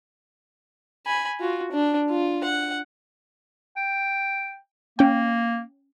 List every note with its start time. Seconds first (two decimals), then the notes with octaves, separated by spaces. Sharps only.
1.06 G#5 B5
1.40 F4 F#4
1.72 D4
2.10 F4
2.44 F#5
3.77 G5
4.99 A#3 C#4 G5